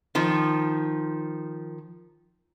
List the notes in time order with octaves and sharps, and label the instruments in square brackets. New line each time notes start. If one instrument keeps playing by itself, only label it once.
[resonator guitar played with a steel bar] D#3 F3